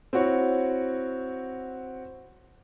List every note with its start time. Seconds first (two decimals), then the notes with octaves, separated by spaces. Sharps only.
0.13 C4 E4 F#4 C#5